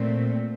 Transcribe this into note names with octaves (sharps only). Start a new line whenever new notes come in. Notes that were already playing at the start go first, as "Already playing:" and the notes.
Already playing: A#2 A3 C4